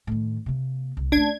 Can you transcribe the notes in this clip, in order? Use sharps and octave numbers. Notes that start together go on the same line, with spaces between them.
A2 D#3
C3 A#3
C2
A3 C#4 D4 G#6